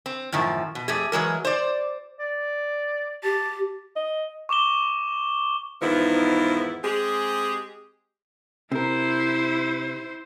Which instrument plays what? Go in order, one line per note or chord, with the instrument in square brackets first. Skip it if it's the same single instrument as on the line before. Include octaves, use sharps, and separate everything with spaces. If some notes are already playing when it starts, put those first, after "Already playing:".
[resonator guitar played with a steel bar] C4
F#2 A2 D#3 F3
B2
F2 A3 G4 G#4
E3 F#3 G#3 A#4
C5 D5
[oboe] D5
[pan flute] G4 [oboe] A5
[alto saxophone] D#5
[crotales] C#6 D6 E7 G7
[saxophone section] E2 G#2 D#3 F3 B3 E4
G#3 C4 G4 G#4
[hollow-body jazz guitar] C3 A#4 [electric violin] E4 C5